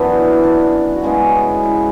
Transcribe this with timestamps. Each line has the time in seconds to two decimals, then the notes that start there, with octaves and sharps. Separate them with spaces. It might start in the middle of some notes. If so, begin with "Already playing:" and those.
Already playing: F#2 E3 B3 D4 E4
0.44 D4
0.95 F#4
1.03 C#3 G#3 B3 E4
1.63 E4